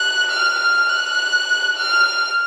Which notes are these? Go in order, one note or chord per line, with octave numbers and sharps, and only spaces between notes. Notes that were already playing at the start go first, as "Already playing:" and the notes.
Already playing: F#6
F6
F6
F#6
F6